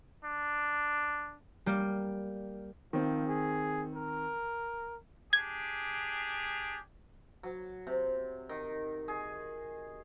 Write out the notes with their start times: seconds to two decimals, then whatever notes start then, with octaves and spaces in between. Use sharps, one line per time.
0.25 D4
1.66 G3 A#3 G4
2.93 D#3 F3 C4
3.27 G#4
3.95 A#4
5.33 D4 G4 G#4 G#6
7.43 F#3
7.87 C3
8.49 D#3
9.08 G#4